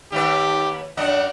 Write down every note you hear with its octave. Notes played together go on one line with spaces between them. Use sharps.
D#2 A3 G4 B4
F#2 D4 D#5 F#5